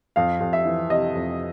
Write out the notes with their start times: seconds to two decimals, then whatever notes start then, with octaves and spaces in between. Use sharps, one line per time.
0.16 F2 F5
0.40 F2
0.53 E5
0.65 E3
0.90 C3 D#5
1.15 F2